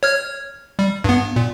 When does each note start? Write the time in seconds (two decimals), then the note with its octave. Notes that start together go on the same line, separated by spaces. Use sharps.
0.03 C#5 F6 G#6
0.79 G3
1.04 G2 B3
1.36 A#2